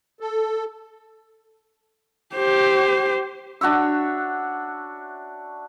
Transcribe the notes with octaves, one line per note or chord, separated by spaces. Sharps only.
A4
G4 C5
D4 F#4 C#5 E5